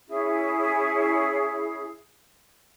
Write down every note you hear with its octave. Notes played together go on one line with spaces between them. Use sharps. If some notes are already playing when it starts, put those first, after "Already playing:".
C#4 E4 G#4